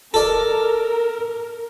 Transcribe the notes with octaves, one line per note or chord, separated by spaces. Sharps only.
A4 A#4 D5